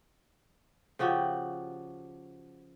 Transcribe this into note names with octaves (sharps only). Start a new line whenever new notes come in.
C#3 F3 F#4 G4